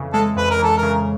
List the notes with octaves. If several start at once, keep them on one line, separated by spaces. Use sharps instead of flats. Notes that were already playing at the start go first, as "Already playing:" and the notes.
Already playing: F2 C#3 E3
G#3 A4
F2 B4
A#4
E3 A4
A#4
C#3